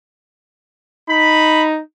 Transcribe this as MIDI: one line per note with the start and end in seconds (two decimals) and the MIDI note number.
1.09 1.80 63
1.09 1.64 83